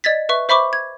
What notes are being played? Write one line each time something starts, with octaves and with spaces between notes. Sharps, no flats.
D5 D#5 G#6 A6 B6
B4 E5 C#6
C5 E5 B5 C#6 D6
G#6